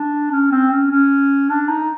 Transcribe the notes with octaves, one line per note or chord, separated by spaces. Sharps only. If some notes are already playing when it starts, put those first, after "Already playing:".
Already playing: D4
C#4
C4
C#4
C#4
D4
D#4